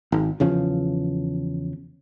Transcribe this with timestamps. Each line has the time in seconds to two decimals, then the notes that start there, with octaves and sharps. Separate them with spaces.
0.12 G#1
0.40 E2 C#3 F3